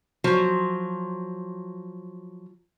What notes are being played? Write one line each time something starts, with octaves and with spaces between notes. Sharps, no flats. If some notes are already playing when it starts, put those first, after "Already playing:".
F3 F#3 C5